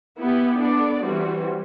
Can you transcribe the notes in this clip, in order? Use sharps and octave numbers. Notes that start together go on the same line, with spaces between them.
B3 E4 G4
B3 D4 A4 D5
E3 G3 C4 F#4